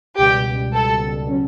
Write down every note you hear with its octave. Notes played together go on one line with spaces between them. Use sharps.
C#2 B2 G3 G4
A4
C#3 F#3 C#4